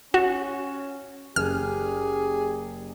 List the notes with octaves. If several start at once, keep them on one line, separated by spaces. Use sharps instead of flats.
C#4 F#4 E7
F#1 G4 G#4 F6